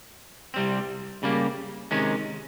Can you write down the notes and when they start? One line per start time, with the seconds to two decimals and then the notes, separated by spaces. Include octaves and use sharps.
0.54 C2 C3 G3 C4
1.23 C#3 G3 A#3
1.91 C3 D#3 G#3 C#4